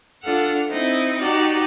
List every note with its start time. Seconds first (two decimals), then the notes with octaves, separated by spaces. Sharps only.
0.22 D4 F4 A4 F#5 F6
0.70 C4 D#4 E4 D#5
1.23 D#4 F#4 G4 D5